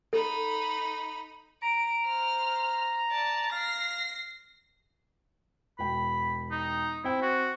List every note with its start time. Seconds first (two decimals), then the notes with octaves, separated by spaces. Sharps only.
0.13 D#4 A4 B5
1.63 A#5 D7
2.07 C5 F6
3.11 D5 A5
3.52 F5 A#6 C7
5.79 E1 G5 B5
6.51 D#4
7.04 C4 E4 G5
7.22 F#4